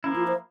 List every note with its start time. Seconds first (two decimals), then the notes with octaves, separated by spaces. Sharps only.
0.04 F3 A#3 C#4 E4
0.16 F4
0.27 C5